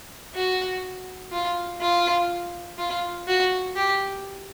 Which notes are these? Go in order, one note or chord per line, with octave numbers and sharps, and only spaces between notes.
F#4
F4
F4
F4
F#4
G4